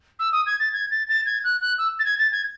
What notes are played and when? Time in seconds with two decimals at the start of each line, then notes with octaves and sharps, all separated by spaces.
0.19 E6
0.32 D#6
0.46 G#6
0.59 A6
0.73 G#6
0.91 A6
1.08 A6
1.26 G#6
1.44 F#6
1.61 F#6
1.78 E6
1.99 A6
2.05 G#6
2.18 A6
2.32 G#6